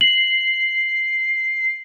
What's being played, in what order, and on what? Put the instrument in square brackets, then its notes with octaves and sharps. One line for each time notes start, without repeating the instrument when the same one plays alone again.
[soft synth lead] C7 [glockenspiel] F#7